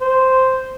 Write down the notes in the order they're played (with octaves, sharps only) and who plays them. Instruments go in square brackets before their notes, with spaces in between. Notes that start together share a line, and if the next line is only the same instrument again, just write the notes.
[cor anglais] C5